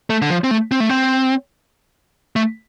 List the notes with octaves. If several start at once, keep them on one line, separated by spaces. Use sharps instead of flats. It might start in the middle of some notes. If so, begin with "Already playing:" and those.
A3
D3
F3
C4
A3
C4
A3
C4
A3